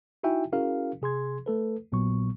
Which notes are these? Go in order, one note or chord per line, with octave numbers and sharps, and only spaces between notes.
D#4 E4 F#4 E5 G5 G#5
C#4 E4 F#4 G#4 A#4 F5
C3 G#4 C6 G#6
A3 A4 B4
A#1 A#2 F#3 B3 C#6